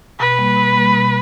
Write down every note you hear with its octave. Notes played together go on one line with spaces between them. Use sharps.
B2 B4
G3 A#3
B2
G3 A#3
B2